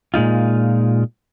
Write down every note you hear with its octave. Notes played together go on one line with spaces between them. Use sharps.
A#2 G#3 D#4 F4